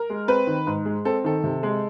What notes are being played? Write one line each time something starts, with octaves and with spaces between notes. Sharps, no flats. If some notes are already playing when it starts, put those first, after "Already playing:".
Already playing: A#4
G#3
C4 B4
D#3
G#2
G#3
C4 A4
D#3 A4
C3
G#3